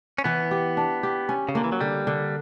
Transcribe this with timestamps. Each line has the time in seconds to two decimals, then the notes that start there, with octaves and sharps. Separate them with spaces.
0.18 C#4
0.24 E3 B3
0.51 G4
0.77 D4
1.03 G4
1.29 C#4
1.49 C#3
1.55 D3 A#3
1.64 E3
1.72 F#3
1.81 D3 G3
2.07 D3